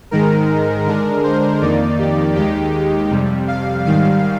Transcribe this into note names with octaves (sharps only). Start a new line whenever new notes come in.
G#2 D#3 G#3 A#4
D3 G#3 D4 A#4
C5
F2 D#3 A#3 D#4 D5
G4
D#2 D#3 G#3 D#4 G4
F2 C3 G3
F5
G#2 D#3 G3 F5